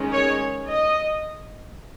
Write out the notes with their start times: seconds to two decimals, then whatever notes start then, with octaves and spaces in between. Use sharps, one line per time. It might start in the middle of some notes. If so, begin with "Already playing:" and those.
Already playing: D#3 G#3 C#4
0.12 C#5
0.66 D#5